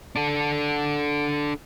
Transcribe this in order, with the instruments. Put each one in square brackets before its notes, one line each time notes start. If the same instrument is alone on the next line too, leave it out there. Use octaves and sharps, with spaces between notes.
[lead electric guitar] D4 A4